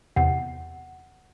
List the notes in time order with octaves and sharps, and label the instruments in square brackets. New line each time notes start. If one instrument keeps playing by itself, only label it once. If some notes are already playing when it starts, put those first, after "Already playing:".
[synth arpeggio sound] E2 C3 [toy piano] F#5